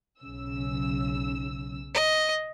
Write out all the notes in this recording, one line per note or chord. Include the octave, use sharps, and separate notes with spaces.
B1 C#3 E6
D#5